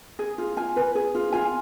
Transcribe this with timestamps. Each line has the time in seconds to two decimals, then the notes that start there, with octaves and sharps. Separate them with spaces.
0.19 G#4
0.38 F4
0.57 F4 G#5
0.76 B4
0.95 G#4
1.15 F4
1.32 F4 G#5